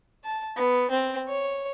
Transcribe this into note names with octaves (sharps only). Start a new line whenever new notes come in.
A5
B3
C4
C#5